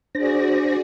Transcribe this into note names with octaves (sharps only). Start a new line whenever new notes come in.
D4 F#4 G#4 C5 D5 A#6